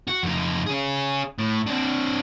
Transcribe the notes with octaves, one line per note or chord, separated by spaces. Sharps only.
F#4
F2 D#4
C#4 G#4
A2
C4 D4